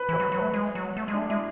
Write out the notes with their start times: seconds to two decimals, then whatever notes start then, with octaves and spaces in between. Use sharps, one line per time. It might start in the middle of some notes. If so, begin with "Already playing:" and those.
Already playing: B4
0.09 E3
0.13 B4
0.20 F#3
0.32 F#3
0.38 A3 B4
0.54 G#3
0.75 F#3
0.97 A3
1.08 G#3
1.13 D4
1.19 A3
1.28 G#3 E4